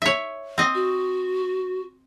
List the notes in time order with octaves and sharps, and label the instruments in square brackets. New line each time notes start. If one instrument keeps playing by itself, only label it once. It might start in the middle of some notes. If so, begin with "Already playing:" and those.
[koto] C#5 E5
C4 D#5
[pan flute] F#4